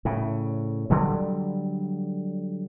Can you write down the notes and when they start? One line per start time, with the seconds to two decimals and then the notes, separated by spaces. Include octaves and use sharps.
0.05 A2 C#3
0.90 D3 F#3 G3